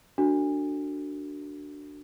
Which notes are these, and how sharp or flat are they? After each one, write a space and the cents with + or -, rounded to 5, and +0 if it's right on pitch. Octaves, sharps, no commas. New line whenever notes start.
D4 +0 F#4 +0 A4 +25